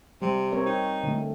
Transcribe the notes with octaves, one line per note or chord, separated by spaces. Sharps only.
C3 G3
C4 A#4 C#5
D#4
D3 A3